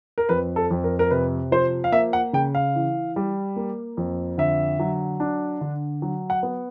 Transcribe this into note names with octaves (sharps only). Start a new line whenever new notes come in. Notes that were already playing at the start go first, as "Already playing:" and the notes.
A#4
F2 B4
A4
F2
A#4
A#4
C3 B4
F3 C5
F5
A#3 E5
F#5
C#3 G5
F5
E3
G3
A#3
F2
D3 E5
F#3
D4
D3
F#3
F#5
B3